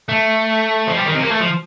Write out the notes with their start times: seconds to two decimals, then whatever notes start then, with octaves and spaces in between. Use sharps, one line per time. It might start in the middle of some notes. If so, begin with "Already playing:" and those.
0.09 A3
0.87 F3
0.96 G3
1.05 D#3
1.14 C3
1.22 A#3
1.31 A3
1.40 F3